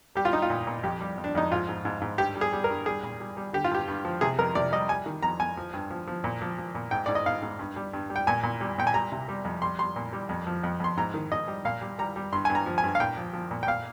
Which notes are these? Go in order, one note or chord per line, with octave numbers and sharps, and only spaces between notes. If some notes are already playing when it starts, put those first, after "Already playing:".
G3 G4
F4
G3 D#4
F4
A#2
A#2
F2 G4
G3
F2
D4
F2 D#4
G#2 F4
G#2
G#2
G#2
G2 G4
G3
G#4
G3
A#4
G2
G3 G#4
A#2
G3
G3
D3 G4
F4
G2 G4
G2
F3
C3 G#4
F2 A#4
C3 D5
G3 D#5
G3 G#5
D#3
F2 A#5
F2 G#5
F3
G2
F3
F3
A#2
F3
F3
A#2
G#2 G5
G#2 D5
D#5
G#2 F5
G#2
G2
G3
G2
G3
G5
A#2 G#5
A#2
G3
A#2 G5
G#5
G3 A#5
C3
G3
F2
G3 C6
G3 C6
A#2
G3
F2
F3
F2
F2 C6
G#2 A#5
D#3
G#2 D#5
G3
A#2 F5
G3
G3 A#5
G3
G2 C6
G2 G#5
A#5
F3
G#5
G2
F5
A#2 G5
F3
F3
A#2
G5
A#2 F5